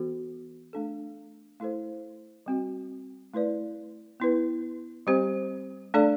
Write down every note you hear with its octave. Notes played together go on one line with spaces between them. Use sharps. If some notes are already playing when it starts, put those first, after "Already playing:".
Already playing: E3 B3 F#4 A4
A3 D4 A4
A3 E4 A4 C5
G3 C4 F#4
A3 E4 B4 D5
B3 E4 B4
G3 C4 G4 C5
A3 D4 A4 D5